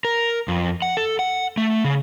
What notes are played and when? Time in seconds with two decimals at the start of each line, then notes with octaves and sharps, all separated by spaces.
0.05 A#4
0.48 F2
0.82 F#5
0.97 A4
1.19 F#5
1.57 A3
1.84 C#3